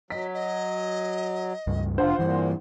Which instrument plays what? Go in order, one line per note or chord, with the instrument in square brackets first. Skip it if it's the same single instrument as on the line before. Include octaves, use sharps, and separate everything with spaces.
[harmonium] F#3 [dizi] D#5 [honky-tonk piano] B6
[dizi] D#5
[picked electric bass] C#2 G2
[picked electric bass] F1 D4 [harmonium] F4 [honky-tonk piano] C5 F#5
[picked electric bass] G2 E3 [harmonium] A#2 [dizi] C6